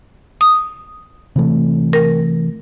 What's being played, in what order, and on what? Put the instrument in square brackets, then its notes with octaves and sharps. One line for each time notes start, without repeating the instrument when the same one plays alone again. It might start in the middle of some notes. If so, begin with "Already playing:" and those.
[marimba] D#6
[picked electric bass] C3 E3 A3
[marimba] A#4